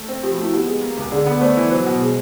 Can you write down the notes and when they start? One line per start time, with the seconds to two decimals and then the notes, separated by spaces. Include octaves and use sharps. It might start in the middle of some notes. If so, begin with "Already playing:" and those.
Already playing: A3
0.09 C4
0.23 F3 G4
0.33 F#4
0.37 A3
0.43 E4
0.53 B3 G4
0.67 G#3
0.82 A#3
0.97 C#2
1.12 D3 G#4
1.26 B3 A4
1.41 A3 C5 D5
1.57 E3
1.71 F#3 C5
1.86 B2
2.01 G#3